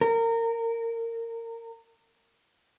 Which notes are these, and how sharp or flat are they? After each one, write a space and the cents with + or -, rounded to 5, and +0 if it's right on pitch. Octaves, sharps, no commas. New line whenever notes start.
A#4 -25